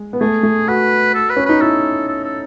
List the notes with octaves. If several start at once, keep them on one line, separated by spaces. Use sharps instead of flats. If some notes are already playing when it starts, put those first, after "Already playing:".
Already playing: G#3
B3
A3 G#4
A3
F#4 B4
A4
B4
C#4
D#4 B4
E4 A4
A4
A4